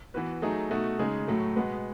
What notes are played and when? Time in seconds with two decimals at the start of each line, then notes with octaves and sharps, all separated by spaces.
0.14 E3 B3 F#4 B4
0.42 F#3 A3 D#4 G#4
0.70 B2 A3 D#4 F#4
0.99 C#3 G#3 D#4 G#4
1.28 A2 F#3 A3
1.56 B2 G#3 B3